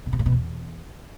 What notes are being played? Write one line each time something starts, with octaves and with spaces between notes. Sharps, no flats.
B2
C3
A#2
B2
E2